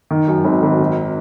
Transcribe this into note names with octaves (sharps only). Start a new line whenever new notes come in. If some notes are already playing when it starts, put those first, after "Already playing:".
D#3
F#2
G#1
G#1
D#3